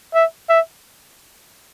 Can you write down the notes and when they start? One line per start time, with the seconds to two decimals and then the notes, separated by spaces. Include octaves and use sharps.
0.14 E5
0.49 E5